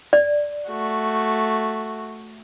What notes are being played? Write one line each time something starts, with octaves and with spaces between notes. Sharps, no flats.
D5
A3 F#4